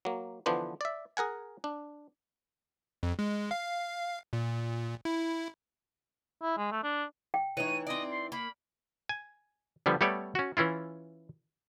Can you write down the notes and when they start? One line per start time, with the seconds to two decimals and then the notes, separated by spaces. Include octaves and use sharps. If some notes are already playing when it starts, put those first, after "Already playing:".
0.05 F#3 A#3
0.46 D3 E3 F3 B3 D4 C5
0.81 D5 E5
1.17 G#4 A#4 F#5 G#5
1.64 D4
3.03 F2
3.19 G#3
3.51 F5
4.33 A#2
5.05 E4
6.43 E4
6.57 G#3
6.72 A3
6.84 D4
7.34 G5
7.57 E3 D#4 C#5 D#7
7.87 C4 D5 D#5
8.10 C6
8.32 A#3 B5
9.09 G#5
9.86 D3 F3 G3 B3
10.01 G3 A3 B3 A4 C#5 D5
10.35 C#4 F#4
10.57 E3 C#4 E4 F4